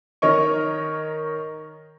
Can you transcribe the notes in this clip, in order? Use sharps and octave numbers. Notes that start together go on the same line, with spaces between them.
D#3 A#4 C#5 D#5 C#6